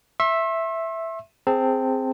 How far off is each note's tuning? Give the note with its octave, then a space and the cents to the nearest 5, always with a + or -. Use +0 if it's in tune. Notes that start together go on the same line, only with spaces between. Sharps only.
E5 +0 C6 +45
C4 +0 G#4 +0 A5 +30